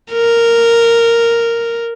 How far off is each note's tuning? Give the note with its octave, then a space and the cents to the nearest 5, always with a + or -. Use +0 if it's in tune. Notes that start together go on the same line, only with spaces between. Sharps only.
A#4 -5